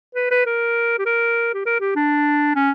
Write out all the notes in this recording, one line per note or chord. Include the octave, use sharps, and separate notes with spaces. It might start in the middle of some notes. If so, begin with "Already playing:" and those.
B4
B4
A#4
G4
A#4
G4
A#4
G4
D4
C#4